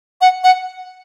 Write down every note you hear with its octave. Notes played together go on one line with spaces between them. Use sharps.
F#5
F#5